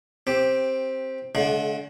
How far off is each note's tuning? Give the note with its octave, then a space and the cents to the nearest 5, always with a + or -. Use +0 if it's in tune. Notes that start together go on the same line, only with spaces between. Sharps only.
C4 +10 G4 +0
D3 -35 G#3 +40 F#4 +0